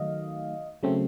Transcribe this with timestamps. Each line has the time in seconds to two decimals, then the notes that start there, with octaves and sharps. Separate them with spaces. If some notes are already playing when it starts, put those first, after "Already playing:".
Already playing: D#3 F#3 A3 D#5 F5
0.83 C#3 F#3 A3 C4